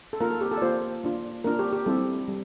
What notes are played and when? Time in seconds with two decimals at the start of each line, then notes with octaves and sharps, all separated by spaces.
0.13 A4
0.21 A#3 F4 A#4
0.31 A4
0.41 G4
0.51 A4
0.58 D5
0.62 A#3 F4 C5
1.04 A#3 D4 F4
1.44 A#3 D4 F4 A#4
1.59 G4
1.72 G4
1.86 G3 C4 E4 A4
2.28 G3